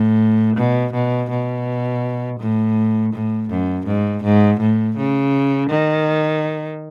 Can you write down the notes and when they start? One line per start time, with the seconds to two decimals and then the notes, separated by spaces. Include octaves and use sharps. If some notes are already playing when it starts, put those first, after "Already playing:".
Already playing: A2
0.57 B2
0.93 B2
1.30 B2
2.40 A2
3.13 A2
3.50 F#2
3.87 G#2
4.24 G#2
4.60 A2
4.97 C#3
5.70 D#3